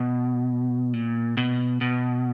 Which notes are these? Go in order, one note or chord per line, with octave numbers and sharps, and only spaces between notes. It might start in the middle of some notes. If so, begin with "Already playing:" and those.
Already playing: B2
A#2
B2
B2